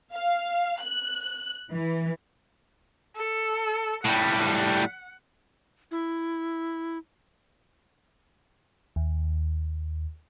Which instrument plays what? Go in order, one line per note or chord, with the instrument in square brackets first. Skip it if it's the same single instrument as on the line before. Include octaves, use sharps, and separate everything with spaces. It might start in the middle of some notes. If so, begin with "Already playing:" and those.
[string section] F5
F#6
E3
[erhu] A4
[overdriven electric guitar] A2 G3 [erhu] F#5
[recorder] E4
[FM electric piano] D#2